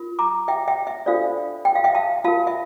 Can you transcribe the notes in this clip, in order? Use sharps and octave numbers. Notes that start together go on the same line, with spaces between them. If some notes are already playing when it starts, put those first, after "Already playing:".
Already playing: F4 A#4
A#5 D6
E5 G5
E5 G5
E5
D4 F4 A4 C5 D5 F5
G5
F5
E5 G5
F5 A5
F4 A#4 F5 A5
E5